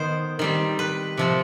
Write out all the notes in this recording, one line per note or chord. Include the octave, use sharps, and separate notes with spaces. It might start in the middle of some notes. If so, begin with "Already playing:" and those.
Already playing: D#3 B3 C5
D#3 G3 C4
B4
C3 F3 C4